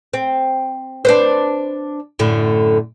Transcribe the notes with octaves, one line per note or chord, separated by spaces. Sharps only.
C4
D4 B4 C5
F#2 A2 D3